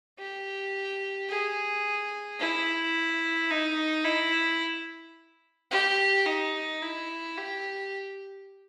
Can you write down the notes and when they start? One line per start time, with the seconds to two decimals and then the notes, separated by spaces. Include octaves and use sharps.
0.19 G4
1.29 G#4
2.39 E4
3.51 D#4
4.05 E4
5.71 G4
6.26 D#4
6.82 E4
7.37 G4